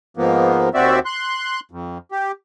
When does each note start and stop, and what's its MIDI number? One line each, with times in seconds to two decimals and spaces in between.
0.17 0.69 44
0.17 0.69 53
0.17 0.69 58
0.17 0.69 59
0.74 0.99 39
0.74 0.99 60
0.74 0.99 66
0.74 0.99 74
0.74 0.99 76
1.06 1.60 84
1.06 1.60 90
1.71 1.98 41
2.12 2.32 67